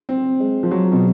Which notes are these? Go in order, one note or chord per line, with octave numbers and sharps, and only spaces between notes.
C4
G#3
F3
F#3
B2